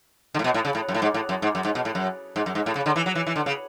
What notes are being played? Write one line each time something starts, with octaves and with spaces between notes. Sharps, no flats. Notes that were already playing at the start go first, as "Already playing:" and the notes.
D3
A2
B2
A2
C#3
A2
F#2
A2
G#2
A2
F#2
G#2
F#2
G#2
B2
A2
F#2
G#2
F#2
G#2
A2
C#3
D3
E3
F#3
E3
E3
D3
C#3